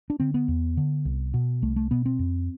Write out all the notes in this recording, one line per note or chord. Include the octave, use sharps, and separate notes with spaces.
D4
D3 C4
B3
E2
D3
C2
B2
C2 A3
A3
B2 B3
C4
F2